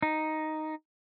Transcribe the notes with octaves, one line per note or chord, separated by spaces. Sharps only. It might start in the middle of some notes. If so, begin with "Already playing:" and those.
D#4